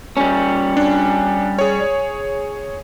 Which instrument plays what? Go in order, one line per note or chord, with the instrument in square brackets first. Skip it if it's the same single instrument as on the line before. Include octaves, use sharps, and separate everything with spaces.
[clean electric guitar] G3 C#4
[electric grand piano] D4
G#4 C#5